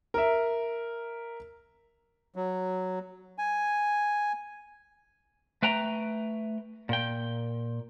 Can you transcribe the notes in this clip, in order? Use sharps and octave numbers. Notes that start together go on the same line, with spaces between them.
A#4 E5
F#3
G#5
A3 B4 G5 A#5
A#2 G5